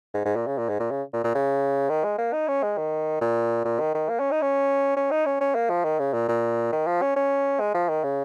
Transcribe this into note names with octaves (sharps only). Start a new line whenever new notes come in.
G#2
G#2
A#2
C#3
A#2
G#2
A#2
C#3
A#2
A#2
C#3
D#3
G#3
A#3
D#4
C#4
G#3
D#3
A#2
A#2
D#3
D#3
A#3
C#4
D#4
C#4
C#4
D#4
C#4
C#4
A#3
F3
D#3
C#3
A#2
A#2
D#3
F3
C#4
C#4
G#3
F3
D#3
C#3